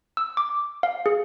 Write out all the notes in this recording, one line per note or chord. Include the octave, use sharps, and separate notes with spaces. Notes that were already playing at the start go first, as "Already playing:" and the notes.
E6
D6
F5
G#4